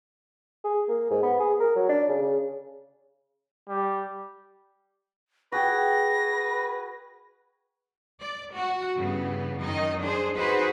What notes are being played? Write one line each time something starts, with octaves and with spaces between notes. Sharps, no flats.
G#4
A#3
G#2
B3
G#4
A#4
F#3
D4
C#3
C#3
G3
F#4 G#4 B4 G5 A#6
D5
F#4
G2 C#3 E3 B3
F#2 D#3 D#4 D#5
D4 G#4 C5
D#4 F#4 G#4 B4 C5